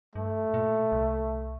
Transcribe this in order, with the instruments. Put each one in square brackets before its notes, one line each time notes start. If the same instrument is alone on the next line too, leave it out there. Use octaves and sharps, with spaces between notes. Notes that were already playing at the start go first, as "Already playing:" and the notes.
[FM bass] G2 [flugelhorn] A3
[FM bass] A#2
C2